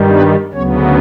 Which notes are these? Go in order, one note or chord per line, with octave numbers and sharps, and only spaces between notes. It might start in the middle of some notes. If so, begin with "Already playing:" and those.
Already playing: G2 D#3 G3
B3 B4
D2 C#3 F#3 B3 C#4 C#5